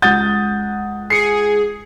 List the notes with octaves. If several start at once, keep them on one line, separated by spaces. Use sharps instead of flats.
C#2 F#5 D#6 G6 A6
G#4 C7 C#7